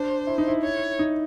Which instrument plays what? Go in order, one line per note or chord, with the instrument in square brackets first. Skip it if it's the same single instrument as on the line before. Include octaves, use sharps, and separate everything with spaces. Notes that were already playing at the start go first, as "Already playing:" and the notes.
Already playing: [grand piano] D4 [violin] C5
[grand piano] E4
D#4
E4
[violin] C#5
[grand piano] D#4